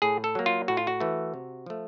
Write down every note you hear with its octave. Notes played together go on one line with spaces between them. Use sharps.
A2 G#4
A4
F#3 A#3
F4
A2 F#4
F4
F#4
E3 A3
C3
F3 A3